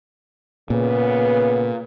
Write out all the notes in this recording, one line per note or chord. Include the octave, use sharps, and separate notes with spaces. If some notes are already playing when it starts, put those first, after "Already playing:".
A#2 C#3 B3